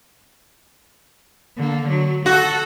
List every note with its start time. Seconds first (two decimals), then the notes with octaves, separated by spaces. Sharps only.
1.57 D3 A#3
1.90 F#3
2.26 F#4 A4